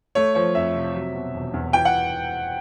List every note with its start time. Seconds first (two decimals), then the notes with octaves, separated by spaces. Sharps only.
0.15 A3 C#5
0.35 F3 C#5
0.55 F2 E5
0.75 C3
0.95 F#3
1.15 B2
1.34 E1
1.54 E2
1.73 E3 G5
1.85 F#5